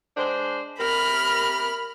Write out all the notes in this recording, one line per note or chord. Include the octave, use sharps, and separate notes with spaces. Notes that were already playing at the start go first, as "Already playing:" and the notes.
G#3 D4 C5
C3 G4 A#4 B5 F6